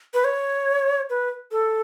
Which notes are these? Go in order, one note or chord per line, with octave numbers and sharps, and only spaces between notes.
B4
C#5
B4
A4